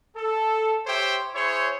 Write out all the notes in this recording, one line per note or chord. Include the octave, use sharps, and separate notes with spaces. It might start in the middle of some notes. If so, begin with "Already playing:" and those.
A4
G4 C5 C#5 E5 G5
E4 G#4 C5 C#5